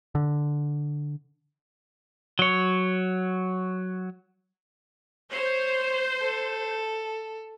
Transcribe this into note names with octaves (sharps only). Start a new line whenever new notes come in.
D3
F#3 C#5
C5 C#5
A4